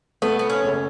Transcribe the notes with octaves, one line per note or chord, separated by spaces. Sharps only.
A3 B3
B3
C#4
F#1